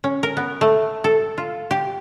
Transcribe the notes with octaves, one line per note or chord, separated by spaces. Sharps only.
C#4
A#4
B3
A3
A4
F4
G4